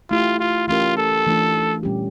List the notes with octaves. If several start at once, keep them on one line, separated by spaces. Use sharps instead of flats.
A3 E4 F4 G4
F4
E3 A3 C#4 F4 G4 A#4
A4
E3 A3 D4 F4
A#2 G3 C#4 G4